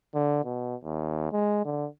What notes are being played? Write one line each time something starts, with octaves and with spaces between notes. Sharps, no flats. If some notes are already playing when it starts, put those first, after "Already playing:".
D3
B2
D#2
G#3
D3